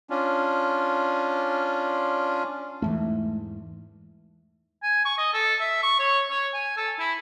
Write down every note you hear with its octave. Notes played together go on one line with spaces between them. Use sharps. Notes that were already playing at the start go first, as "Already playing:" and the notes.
C#4 D4 F4
E2 G#2 E3 A3
G#5
C#6
D#5
A4
E5
C#6
C#5
C#5
G#5
A4
E4